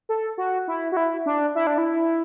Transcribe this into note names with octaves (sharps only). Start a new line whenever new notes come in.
A4
F#4
E4
F#4
E4
D4
E4
D4
E4